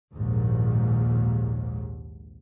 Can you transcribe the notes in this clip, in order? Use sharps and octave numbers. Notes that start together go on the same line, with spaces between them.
A#1 D#2 G#2